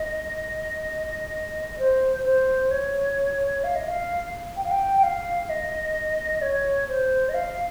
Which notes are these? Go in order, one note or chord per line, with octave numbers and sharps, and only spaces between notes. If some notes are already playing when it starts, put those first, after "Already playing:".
Already playing: D#5
C5
C5
C#5
F5
D#5
F5
G5
F5
G5
G5
F5
D#5
C#5
C5
D#5
F5